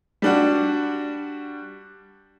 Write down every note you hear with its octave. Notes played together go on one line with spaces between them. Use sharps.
G3 D4 F#4